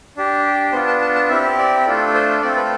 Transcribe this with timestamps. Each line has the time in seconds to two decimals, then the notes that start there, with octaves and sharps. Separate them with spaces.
0.17 D4 G4
0.72 B3 D4 F4 C5
0.87 A5
1.02 A5
1.15 A5
1.29 C4 E4 G4 E5
1.58 D5
1.86 A3 D4 F4 A4
2.14 C5
2.42 A3 C4 F4 A4 D5
2.57 B4